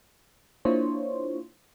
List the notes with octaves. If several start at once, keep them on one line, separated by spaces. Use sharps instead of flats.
A#3 D4 E4 F4 C5 C#5